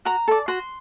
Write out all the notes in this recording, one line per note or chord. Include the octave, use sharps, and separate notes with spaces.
F#4 A#5
A4 D5
F#4 C6